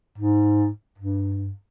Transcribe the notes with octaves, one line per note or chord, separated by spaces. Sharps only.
G#2
G2